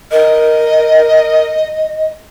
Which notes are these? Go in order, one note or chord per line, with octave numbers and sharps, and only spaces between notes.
A#4 D#5